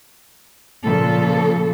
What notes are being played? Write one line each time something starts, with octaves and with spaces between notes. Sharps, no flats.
A#2 C#3 F3 A4